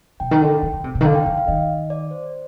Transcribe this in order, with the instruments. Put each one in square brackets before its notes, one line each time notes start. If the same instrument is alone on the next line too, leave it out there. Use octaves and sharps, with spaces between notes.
[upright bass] B2 [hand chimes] G5
[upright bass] D#3
D3
D#3
D3
C3
B2
D#3
[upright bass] D3 [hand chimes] F5
[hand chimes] G5
[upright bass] D3 [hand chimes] G5
[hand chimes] F5
[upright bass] D#3 [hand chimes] D#5
[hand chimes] D5
C5